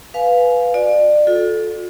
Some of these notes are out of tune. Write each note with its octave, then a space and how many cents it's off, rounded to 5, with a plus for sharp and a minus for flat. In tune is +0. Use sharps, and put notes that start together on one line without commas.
B4 +0 F5 +0 G#5 +25
F#4 -35 D5 +30
F4 +45 A4 -10